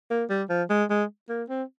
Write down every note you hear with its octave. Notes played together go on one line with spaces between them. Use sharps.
A#3
G3
F3
G#3
G#3
A#3
C4